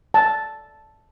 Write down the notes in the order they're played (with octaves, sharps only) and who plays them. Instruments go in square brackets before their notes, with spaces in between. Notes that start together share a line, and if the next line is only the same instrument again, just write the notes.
[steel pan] A5